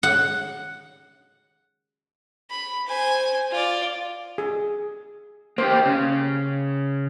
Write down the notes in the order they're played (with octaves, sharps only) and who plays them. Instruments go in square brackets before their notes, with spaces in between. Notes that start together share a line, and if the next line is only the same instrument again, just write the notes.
[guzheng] F#5
[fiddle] B5
C5 G#5
F4 D5
[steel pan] G#4
[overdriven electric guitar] A#3 G4 [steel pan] C5
[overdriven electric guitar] C#3